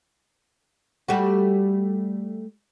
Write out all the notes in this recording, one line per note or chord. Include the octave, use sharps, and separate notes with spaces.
G3 A3 F#4